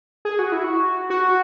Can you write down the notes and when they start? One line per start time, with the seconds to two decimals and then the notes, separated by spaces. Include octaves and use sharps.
0.25 G#4
0.39 F#4
0.52 E4
0.64 F#4
1.10 F#4